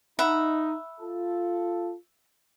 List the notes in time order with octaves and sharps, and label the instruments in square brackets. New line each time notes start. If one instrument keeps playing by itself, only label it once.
[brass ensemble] D#4 [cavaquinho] E5 F#5 B5
[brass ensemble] F4 A4